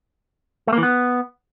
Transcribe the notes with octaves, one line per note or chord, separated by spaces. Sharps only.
A3
A#3
E3
B3